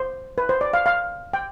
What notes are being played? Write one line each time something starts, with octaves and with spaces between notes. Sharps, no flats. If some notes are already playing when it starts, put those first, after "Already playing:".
Already playing: C5
B4
C5
D5
F5
F5
G5